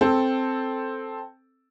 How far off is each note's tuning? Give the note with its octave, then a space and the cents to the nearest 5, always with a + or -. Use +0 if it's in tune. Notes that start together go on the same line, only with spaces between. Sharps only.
C4 +0 A4 +0